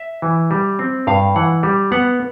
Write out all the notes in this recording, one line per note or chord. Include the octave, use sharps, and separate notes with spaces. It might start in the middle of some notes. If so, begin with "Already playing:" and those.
Already playing: E5
E3
G3
C4
G2 F5
E3 F#5
G3
B3 F#5